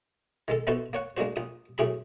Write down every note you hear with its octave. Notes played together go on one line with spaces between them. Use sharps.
D#3 G#3 A4
B3 D#4 E4 F#4 A4 C5
A#3 C#5 F#5
G#3 A#3 D4 F#4 C5
A#1 D#6
F#2 A2 G#4 B5